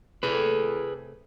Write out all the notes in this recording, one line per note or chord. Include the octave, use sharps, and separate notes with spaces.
C3 A3 G#4 A4 B4